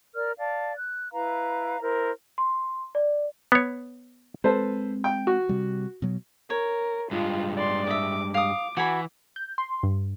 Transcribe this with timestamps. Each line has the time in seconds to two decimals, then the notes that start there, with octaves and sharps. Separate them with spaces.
0.16 A#4 D5 F6
0.39 D5 F5 A5
0.77 F#6
1.13 E4 B4 F5 A#5
1.81 E4 A#4 C5
2.38 C6
2.95 D5
3.52 B3 C#5
4.44 G#3 C4 A4 B4 C5
5.04 G5
5.27 F#4
5.49 C3 G3
6.02 B2 F#3
6.50 A#4 C#5
7.11 G2 G#3 F4
7.57 D5 C6
7.87 D#5 E5 D6
8.34 F5 D6 D#6
8.77 E3 F#4 G#5 B5
9.36 G6
9.58 C6
9.83 G2